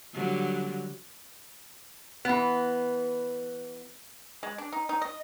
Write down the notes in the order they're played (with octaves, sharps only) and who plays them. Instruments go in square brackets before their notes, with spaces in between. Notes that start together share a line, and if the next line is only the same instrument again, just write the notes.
[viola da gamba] D3 F#3 G3
[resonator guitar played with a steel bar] E3 B3
[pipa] G#3
D4
D#4
D#4
D#5